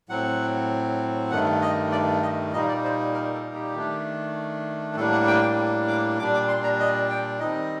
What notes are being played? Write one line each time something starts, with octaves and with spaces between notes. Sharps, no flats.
A2 F#3 C4 F#5
G2 D#3 A3 F#5
D#5
D5
D#5
A#2 G3 A#3 D#4 D#5
D5
C5
A#4
A4
G4
D#3 A3 D4
A2 G3 A#3 D4 A4
F#5
G5
G5
D6
A#2 G3 D4 D6
D6
C6
A#5
D#5
G5
D#3 G3 C4 D#4 D#5